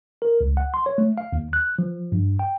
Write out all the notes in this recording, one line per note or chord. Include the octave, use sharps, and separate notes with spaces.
A#4
C#2
F#5
C6
C#5
A3
F5
D#2
F#6
F3
G2
G5